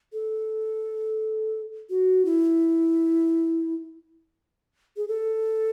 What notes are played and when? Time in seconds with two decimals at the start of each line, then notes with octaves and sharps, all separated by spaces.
0.13 A4
1.90 F#4
2.25 E4
4.97 G#4
5.08 A4